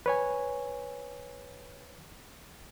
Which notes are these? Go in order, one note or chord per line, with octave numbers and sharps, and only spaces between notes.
B4 C#5 G#5